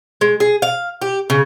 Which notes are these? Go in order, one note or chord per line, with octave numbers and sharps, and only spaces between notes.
G#3
G#4
F5
G4
C#3